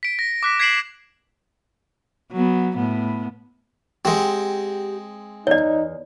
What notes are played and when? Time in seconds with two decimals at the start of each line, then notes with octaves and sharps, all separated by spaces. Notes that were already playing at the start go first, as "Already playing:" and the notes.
0.03 B6 D7
0.19 A#6
0.43 D6 F#6 B6
0.60 G#6 B6 C7 D7 E7 F#7
2.32 F#3 B3
2.76 A2 B3
4.05 G#3 C4 G4 F#5
5.47 E2 D#4 C#5 D5